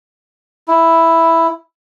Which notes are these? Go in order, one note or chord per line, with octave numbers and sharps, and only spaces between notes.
E4